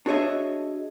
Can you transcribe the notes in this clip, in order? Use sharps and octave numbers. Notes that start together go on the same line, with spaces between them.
D4 F#4 G#4 C#5 D#5 E5